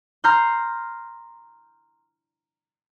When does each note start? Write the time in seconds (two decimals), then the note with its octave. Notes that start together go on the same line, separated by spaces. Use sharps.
0.24 A#5 C6 F6 G6